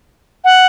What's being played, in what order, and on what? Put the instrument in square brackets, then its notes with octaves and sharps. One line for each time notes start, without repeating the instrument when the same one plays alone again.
[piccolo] F#5